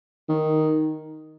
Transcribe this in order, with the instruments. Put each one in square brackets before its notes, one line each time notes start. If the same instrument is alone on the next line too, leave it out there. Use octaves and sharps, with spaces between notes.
[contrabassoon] D#3